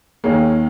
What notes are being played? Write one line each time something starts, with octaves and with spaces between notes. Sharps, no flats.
D#2 D#3 A#3 G#4 C#5